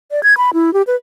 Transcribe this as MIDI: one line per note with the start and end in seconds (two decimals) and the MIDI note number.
0.11 0.23 74
0.23 0.37 92
0.37 0.50 83
0.54 0.73 64
0.74 0.82 67
0.87 0.96 71